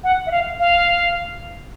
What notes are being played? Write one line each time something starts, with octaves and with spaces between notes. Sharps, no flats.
F#5
E5
F5
F5